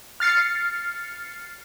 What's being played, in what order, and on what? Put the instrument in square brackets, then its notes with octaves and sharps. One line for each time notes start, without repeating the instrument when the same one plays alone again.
[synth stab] F6 A6 C7 C#7